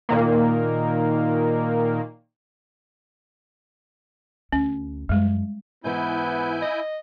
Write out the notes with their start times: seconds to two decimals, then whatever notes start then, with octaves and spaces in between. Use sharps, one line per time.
0.09 A#2 D#3 A#3
4.52 D2 C#4
5.09 F#2 G3 G#3
5.84 G#2 E3 B3 E4 G#5 G6
6.62 D#5